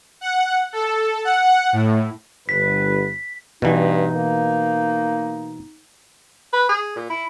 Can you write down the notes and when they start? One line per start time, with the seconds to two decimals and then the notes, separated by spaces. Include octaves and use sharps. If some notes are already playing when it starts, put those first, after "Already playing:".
0.21 F#5
0.73 A4
1.25 F#5
1.73 A2
2.49 G1 B4 B6
3.62 G2 B2 E3 D#4
4.16 A#3
6.53 B4
6.69 G#4
6.96 A#2
7.10 E4